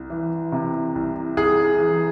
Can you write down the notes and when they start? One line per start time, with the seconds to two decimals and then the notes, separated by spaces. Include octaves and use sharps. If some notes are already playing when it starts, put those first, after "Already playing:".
Already playing: C2
0.10 E3
0.52 C3
0.95 C2
1.37 C2 G#4
1.79 E3